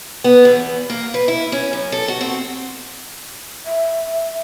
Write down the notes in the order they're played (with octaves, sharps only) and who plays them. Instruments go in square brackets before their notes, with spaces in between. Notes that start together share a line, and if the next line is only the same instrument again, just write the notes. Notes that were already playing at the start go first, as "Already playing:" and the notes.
[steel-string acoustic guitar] B3
E2
A#3
B4
E4
C#4
F#2
A4
F#4
C4
[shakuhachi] E5